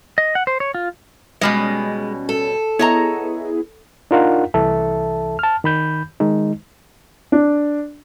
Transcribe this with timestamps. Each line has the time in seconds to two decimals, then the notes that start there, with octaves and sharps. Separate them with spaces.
0.18 D#5
0.35 F#5
0.47 C5
0.60 C#5
0.75 F4
1.41 B2 G3 G#3 C#4 D#5
2.29 A4
2.79 B3 E4 G#4 C#5 D#5 A#5
4.11 D4 D#4 F4 A#4 F5 F#5
4.54 C2 E3 A4 E5 A5
5.39 A5 F6
5.64 D#3 B5 G6
6.20 D#3 G#3 D#4
7.32 D4